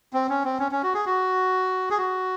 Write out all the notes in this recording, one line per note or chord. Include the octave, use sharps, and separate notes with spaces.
C4
C#4
C4
C#4
C#4
F#4
G#4
F#4
G#4
F#4